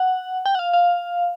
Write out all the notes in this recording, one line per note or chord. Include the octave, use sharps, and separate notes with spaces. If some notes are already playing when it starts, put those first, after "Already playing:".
Already playing: F#5
G5
F#5
F5
F5